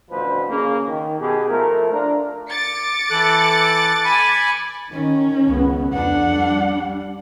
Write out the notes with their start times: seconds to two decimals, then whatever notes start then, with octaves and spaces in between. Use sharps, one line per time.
0.10 A1 D2 B2 F3 B4 C5
0.49 C#3 A#3 C#4
0.87 D#3
1.19 B2 G4 G#4
1.48 F3 A3 E4 A#4
1.93 D4 F4 A#4
2.48 D6 A6 C#7
3.10 E3 A4 F#6
4.05 G#5 B5
4.92 D#3 C#4
5.46 C#2 B3
5.93 F2 D4 F#5
6.31 G3